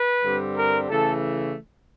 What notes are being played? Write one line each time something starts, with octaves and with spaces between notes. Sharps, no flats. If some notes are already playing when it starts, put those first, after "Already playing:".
Already playing: B4
G2 D3 G3 C4
A#4
C#3 E3 A3 A4